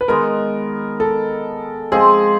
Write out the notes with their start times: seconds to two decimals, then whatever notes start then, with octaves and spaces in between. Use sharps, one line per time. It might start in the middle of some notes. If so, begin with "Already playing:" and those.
0.01 B4
0.08 D#3 G#3 B3 A#4
1.00 A4
1.92 F3 G#3 C4 G#4